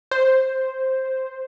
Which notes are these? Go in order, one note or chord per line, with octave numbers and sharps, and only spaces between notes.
C5